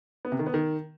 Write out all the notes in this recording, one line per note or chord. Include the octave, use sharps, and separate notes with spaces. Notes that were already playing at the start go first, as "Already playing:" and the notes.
B3
C3
D#3
B3
D#3